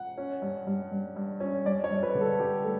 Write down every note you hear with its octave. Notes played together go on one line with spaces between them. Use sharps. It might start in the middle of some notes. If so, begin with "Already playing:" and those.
Already playing: F#5
C#4
G2
G2
G2
G2
C#4
G2 D5
C#5
G2
B4
D3
A4
G2 G4
A3 A4